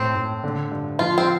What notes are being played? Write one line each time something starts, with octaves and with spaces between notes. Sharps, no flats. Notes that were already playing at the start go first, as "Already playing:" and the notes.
Already playing: A2 C4
A2
D3
G2
F3 F4
C4